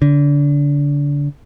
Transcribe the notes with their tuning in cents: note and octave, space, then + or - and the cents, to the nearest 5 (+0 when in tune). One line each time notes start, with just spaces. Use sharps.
D3 -30